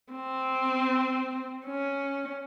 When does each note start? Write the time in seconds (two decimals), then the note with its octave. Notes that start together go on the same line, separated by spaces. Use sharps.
0.13 C4
1.66 C#4